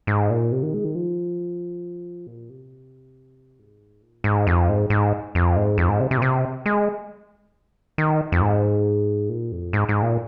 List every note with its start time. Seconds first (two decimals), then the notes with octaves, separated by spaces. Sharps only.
0.07 G#2
0.30 A#2
0.52 C3
0.63 D#3
0.74 G#3
0.84 D#3
0.95 F3
2.27 A#2
2.50 C3
3.59 G#2
4.02 A#2
4.24 G#2
4.47 F2
4.69 G#2
4.90 G#2
5.35 F2
5.56 G#2
5.78 F2
5.89 G#2
6.00 C3
6.11 C3
6.18 A#2
6.22 C3
6.66 G#3
7.98 D#3
8.32 F2
8.41 G#2
9.30 A#2
9.52 F2
9.73 G#2
9.89 G#2
10.02 A#2